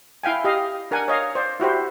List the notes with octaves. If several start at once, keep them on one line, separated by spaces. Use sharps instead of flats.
E4 F5 G5 G#5
G4 D#5 F5
D4 A#4 F#5 G#5
C#5 D#5 F5
C5 D5
E4 F#4 G4 C5